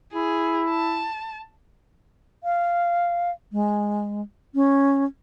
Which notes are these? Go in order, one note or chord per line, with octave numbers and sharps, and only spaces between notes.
E4 G#4
A5
F5
G#3
C#4